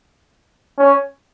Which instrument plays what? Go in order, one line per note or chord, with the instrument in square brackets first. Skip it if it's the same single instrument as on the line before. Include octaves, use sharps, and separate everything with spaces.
[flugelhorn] C#4